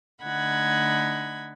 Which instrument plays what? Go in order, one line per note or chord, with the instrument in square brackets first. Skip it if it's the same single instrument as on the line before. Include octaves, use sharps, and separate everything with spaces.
[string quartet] D3 A3 D#4 F#5 B5 G#6